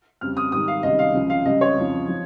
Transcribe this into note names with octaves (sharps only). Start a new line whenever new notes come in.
F2 C#3 G3 F6
D#6
G#2 D#3 G3 D#6
F5
C#2 C3 D#3 G3 D#5
F5
C#2 C#3 F3
F5
C#2 C#3 G3 D#5
C#5
F2 C#3 F3
F3